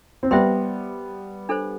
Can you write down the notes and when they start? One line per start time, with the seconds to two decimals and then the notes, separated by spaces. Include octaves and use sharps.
0.23 C4
0.31 G3 B3 C5 E5 G5 C6
1.49 D4 A4 C5